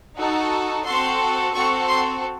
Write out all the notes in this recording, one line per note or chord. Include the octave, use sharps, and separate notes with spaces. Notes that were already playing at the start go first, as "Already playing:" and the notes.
D#4 F#4 A4
C4 F#4 A4 C6
C4 F#4 A4 C#6
C6